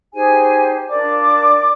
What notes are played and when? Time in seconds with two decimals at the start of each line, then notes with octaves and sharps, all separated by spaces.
0.13 D#4 G4 G#4 C5 G#5
0.88 D4 F4 A#4 D5 D6